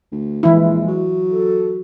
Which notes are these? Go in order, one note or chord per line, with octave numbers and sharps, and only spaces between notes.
D2
A#1 E3 G#3 E4
F#3
A4